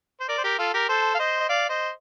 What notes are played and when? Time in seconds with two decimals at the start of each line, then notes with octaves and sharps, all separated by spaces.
0.20 C5
0.28 A#4 D5
0.38 C5
0.44 G4 A#4
0.58 F4 A4
0.74 G4 A#4
0.89 A4 C5
1.14 F5
1.19 C5 D#5
1.40 D#5
1.49 D5 F5
1.69 C5 D#5